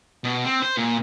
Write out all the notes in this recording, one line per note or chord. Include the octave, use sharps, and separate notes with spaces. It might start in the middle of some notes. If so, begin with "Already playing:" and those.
B2
C4
C5
A#2